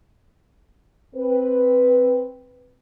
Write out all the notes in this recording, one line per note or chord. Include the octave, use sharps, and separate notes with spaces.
C4 B4